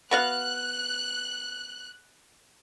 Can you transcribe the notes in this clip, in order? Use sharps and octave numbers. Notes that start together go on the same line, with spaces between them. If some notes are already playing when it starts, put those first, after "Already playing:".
B3 F#4 F5 F#6